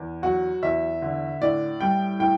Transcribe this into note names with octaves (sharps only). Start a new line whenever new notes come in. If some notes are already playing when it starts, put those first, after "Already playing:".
Already playing: E2
F#3 F#4
E2 E5
D3
A2 D5
G3 G5
A2 G5